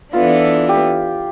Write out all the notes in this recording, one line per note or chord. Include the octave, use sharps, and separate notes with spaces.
E3 B3 D4 F4 A4
G4